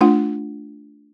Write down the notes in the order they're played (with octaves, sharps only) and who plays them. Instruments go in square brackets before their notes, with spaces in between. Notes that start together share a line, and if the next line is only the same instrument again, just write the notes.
[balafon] A3 D4 F4 F#5